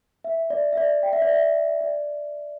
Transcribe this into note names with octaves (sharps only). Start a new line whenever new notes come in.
E5
D5
E5
D5
G5
E5
D5
E5
D5